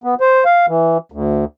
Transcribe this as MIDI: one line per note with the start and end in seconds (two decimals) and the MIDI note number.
0.04 0.15 59
0.21 0.44 72
0.45 0.66 77
0.68 0.98 52
1.12 1.45 38